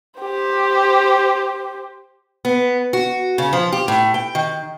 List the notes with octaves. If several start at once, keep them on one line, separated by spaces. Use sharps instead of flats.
G4 C5
B3
F#4
C#3
F3
G4
A2
G5
D#3